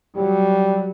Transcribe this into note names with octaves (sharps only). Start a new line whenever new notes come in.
F#3 G3